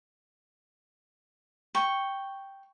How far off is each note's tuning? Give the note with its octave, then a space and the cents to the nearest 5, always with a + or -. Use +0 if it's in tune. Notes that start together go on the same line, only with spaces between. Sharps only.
G5 +0 C#6 +0